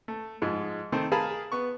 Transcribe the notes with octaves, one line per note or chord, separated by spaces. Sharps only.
A3
G#2 F3 G#3
D#3 A3 C4
G#4 A#4 F5 G#5 A5 B5
B3 C#6